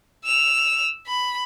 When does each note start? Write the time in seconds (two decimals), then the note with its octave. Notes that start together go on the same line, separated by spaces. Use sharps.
0.25 E6 F7
1.07 B5